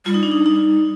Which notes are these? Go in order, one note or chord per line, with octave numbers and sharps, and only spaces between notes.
G3 F4
D#4
D4
D#4
D#4